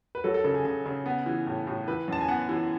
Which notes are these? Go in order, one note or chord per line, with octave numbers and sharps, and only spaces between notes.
B4
F#3 A4
A4
C#3 A4
G#4
C#3 G#4
C#3
B3
E3
A2
A2
E3 B4
F#2 A5
G#5
B3 F#5
E3